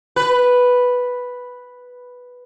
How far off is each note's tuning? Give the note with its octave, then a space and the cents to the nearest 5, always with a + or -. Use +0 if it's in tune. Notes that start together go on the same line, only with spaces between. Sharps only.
B4 +0